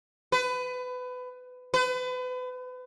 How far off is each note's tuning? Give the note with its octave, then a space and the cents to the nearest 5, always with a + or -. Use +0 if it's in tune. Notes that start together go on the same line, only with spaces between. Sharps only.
B4 +25
B4 +35